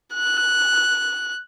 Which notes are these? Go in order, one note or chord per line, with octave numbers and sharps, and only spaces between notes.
F#6